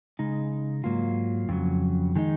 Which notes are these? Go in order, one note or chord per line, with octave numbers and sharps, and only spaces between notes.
C#3 G#3 D#4
G#2 F#3 A#3 F4
F2 C#3 F#3
D#3 G#3 D#4